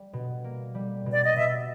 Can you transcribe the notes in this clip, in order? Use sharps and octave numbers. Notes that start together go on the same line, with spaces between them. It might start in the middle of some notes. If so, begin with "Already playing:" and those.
Already playing: G3
B2
A#3
G3
B2
D5
D#5
B2 E5